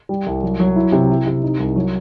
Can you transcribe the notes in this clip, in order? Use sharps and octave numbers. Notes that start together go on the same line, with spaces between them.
G3
C2
F#3
F#3
E4
C3
E4
C3
D#4
C2
F#3